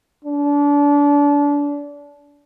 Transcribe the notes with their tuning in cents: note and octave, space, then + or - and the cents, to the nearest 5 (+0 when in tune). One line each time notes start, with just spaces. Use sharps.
D4 -30